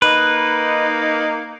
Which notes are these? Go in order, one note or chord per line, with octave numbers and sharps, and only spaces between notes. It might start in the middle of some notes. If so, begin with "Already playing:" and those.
A#3 D#4 B4